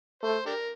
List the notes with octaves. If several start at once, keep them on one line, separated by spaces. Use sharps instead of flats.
A3 C5
D4 G4 A#4